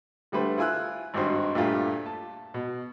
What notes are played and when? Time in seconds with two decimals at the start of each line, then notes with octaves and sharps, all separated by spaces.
0.32 D3 G3 A3 B4 C5
0.58 E4 F4 G#5 E6 F#6
1.14 G#1 G2 D#4 F#4 C5
1.55 G2 A#2 A3 F4 G4
2.06 A5
2.54 B2